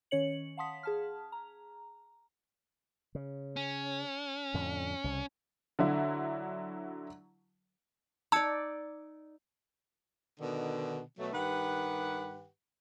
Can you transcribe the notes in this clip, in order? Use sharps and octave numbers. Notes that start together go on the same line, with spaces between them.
D#3 C#4 C#5 C#7 F#7
F5 F#5 A5 C6 D#6 B6
G#4 A5 F6
A#5
C#3
C#4
F2 A2 D3
C2 C#3
D3 F#3 E4
D#4 D5 A5 E6 G#6 C#7
B2 D3 D#3
B2 F#3 A3
G2 D#3 G4 B4 F#5